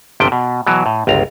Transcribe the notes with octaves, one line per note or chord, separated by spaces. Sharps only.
G1 C3 F3 G5
B2
B2 E3 F#3
A2
G1 C#2 A#5